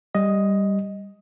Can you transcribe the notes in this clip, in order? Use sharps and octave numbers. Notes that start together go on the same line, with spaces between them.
G3 D#5